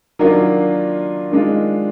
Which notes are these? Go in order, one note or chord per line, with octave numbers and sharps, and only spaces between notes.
D#3 F#3 A#3 D4 F4
D#3 G#3 D4 F4